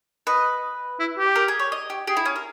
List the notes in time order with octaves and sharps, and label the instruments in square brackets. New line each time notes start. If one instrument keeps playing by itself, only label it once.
[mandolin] B4 [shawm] D#5
[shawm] E4
G4
[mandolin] A#4
G#4
C#5
D#5
G4
[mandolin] G4 [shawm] G#4
[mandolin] E4
C#4
A#4